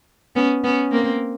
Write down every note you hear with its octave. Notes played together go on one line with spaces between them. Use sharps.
B3 C#4
B3 C#4
A#3 C4